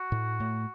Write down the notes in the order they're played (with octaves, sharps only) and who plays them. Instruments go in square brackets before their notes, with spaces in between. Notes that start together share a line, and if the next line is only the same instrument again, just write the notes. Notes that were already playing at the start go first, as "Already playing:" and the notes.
Already playing: [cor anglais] F#4
[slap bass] A2
A2